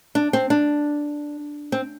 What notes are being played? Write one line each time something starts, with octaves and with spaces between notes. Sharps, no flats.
D4
C4
D4
C4